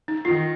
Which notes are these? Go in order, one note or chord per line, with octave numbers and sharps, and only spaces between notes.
D#4
D#3 F4